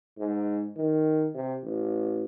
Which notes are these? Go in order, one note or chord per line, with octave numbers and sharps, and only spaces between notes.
G#2
D#3
C3
A1